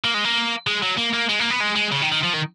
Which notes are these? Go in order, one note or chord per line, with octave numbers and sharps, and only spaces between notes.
A#3
G#3
A#3
G#3
F#3
A#3
A#3
G#3
A#3
B3
G#3
G#3
C#3
D#3
D#3
F3
D#3